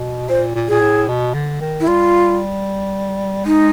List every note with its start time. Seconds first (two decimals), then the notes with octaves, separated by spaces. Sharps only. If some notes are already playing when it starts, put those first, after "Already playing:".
Already playing: B2
0.29 A#2 C5
0.55 A#2
0.68 A#2 G#4
0.81 A2
1.08 B2
1.34 D3
1.61 D#3
1.80 E4
1.87 G3 F4
3.45 G#3 D#4